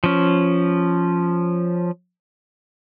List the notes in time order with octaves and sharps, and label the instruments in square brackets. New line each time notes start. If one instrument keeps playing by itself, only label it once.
[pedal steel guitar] F3 C#4